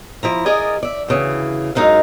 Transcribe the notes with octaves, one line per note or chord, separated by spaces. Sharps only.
F3 E4 A#5
G#4 A#4 D5 D#5
D5 E5
D2 C#3 E3
F#2 G#3 D#4 A#4 F5